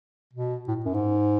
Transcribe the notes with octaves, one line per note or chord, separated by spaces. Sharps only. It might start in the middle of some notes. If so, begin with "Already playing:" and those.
B2
A2
F#2
G#2